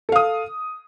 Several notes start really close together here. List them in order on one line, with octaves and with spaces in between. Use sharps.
A4 F5 D#6